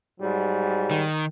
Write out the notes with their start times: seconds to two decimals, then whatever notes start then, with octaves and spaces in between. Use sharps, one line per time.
0.20 G#2 F#3 G3
0.91 D#3